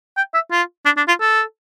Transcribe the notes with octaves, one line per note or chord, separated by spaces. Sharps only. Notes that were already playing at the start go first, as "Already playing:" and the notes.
G5
E5
F4
D4
D4
F4
A4